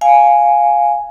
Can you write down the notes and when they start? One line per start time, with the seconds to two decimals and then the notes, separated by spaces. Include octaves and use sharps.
0.01 F5 G#5